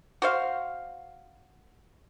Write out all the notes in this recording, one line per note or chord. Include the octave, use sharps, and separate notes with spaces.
F#4 C5 F5